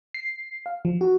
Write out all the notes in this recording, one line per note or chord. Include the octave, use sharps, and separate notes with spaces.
C7
F5
F3
F#4